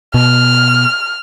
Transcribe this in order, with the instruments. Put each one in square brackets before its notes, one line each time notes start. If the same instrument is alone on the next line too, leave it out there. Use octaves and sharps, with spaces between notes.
[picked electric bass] B2 [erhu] F6